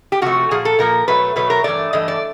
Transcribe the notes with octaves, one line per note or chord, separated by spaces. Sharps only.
G4
C3 F3 A3 F#4
A#2 F3 A#3 G#4
A4
A#2 F3 A#3 A#4
B2 F#3 A3 B4
B2 F#3 A3 B4
A#4
G2 E3 A3 D5
G2 E3 A3 D#5
D5